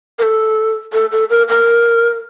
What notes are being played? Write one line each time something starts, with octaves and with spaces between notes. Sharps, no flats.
A#4
A4
A4
A4
A#4
A#4